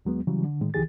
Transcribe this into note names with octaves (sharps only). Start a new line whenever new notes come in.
D#2 F#3 G#3 B3
C#3 E3 F#3 G3
D3
A2 D#3 G#3
C2 D#3 E3 G4 G#4 A6